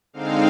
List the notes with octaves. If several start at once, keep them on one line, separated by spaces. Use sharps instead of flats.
D3 G#3 C4 D#4 F5